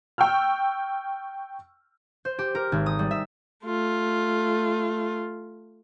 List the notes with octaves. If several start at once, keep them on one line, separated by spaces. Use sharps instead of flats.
G5 C#6 E6 F6
C5
G4
A#4
G#1
D#6
G3
E5
A3 F4